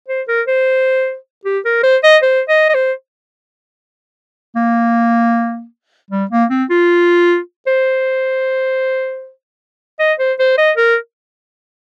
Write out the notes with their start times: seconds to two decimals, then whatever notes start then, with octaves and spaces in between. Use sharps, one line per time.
0.09 C5
0.28 A#4
0.48 C5
1.45 G4
1.65 A#4
1.83 C5
2.03 D#5
2.23 C5
2.49 D#5
2.69 D#5
2.74 C5
4.56 A#3
6.11 G3
6.31 A#3
6.50 C4
6.70 F4
7.67 C5
10.00 D#5
10.19 C5
10.39 C5
10.58 D#5
10.77 A#4